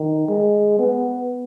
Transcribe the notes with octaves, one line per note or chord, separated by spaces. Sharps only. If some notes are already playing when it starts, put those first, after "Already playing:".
Already playing: D#3
G#3
B3